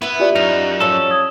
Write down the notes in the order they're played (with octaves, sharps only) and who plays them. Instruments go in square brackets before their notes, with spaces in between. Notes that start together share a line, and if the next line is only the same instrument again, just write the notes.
[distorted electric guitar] B3 [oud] E4 B4
[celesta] F4 G4 D5
[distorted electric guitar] F#2 [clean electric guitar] D#4 [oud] F5
[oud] F3 C#4 [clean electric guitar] A4
[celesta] D#6 G#6